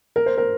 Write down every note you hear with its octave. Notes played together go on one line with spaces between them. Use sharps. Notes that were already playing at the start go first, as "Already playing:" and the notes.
A#4
C5
A#4